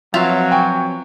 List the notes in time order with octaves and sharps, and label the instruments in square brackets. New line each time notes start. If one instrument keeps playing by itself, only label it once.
[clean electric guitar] F3 C4 B4 [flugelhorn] F#3 [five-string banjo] F4 E5 F5
[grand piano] G5 G#5 C#6